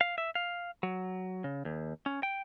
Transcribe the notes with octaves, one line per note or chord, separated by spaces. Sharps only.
F5
E5
F5
F#3
C#3
D#2
C#4
G5